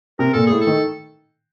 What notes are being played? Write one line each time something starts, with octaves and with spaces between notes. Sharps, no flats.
C3 A#4
A#2 A4
A2 G#4
A4
D#3